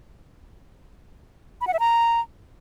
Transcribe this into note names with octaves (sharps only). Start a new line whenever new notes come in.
B5
F#5
E5
A#5